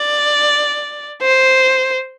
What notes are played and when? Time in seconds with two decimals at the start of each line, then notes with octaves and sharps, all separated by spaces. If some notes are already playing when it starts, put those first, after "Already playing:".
Already playing: D5
1.22 C5